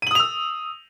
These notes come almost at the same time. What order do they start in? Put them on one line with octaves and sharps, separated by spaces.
D#7 F#7 D#6 F7 E6